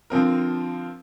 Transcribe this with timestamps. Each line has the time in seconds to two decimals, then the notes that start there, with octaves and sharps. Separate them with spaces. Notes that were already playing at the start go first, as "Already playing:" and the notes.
0.10 D3 F3 C4 A#4